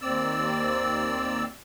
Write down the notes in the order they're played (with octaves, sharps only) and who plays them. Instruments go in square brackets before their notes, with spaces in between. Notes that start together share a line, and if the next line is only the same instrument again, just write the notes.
[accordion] D#2 C4 D5 E6